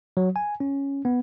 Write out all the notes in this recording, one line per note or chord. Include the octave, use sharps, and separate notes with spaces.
F#3
G#5
C#4
B3